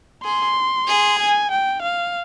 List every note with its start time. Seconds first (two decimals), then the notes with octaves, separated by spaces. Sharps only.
0.24 G#4 C6
0.88 G#4
1.19 G#5
1.51 G5
1.82 F5